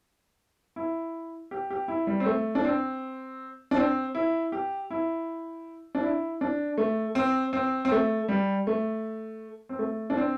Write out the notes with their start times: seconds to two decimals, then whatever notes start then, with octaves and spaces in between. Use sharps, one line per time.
0.76 E4
1.51 G4
1.71 G4
1.88 E4
2.07 G3
2.20 C4
2.26 A3
2.55 D4
2.65 C4
3.71 D4
3.76 C4
4.15 E4
4.52 G4
4.91 E4
5.95 D4
6.03 E4
6.41 D4
6.78 A3
7.15 C4
7.53 C4
7.85 C4
7.92 A3
8.28 G3
8.67 A3
9.69 C4
9.79 A3
10.10 D4
10.17 C4